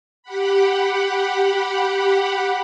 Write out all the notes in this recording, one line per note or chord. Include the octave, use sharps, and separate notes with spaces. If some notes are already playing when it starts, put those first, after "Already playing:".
G4 F#5 B5